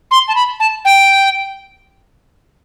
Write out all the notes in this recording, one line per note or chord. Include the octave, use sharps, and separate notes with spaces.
C6
A5
B5
A5
G5